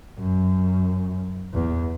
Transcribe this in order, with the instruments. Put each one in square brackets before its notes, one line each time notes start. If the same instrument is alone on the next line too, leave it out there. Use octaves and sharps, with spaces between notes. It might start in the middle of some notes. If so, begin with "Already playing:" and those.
[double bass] F#2
E2